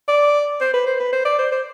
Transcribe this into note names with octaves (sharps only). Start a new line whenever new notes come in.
D5
C5
B4
C5
B4
C5
D5
C5
C5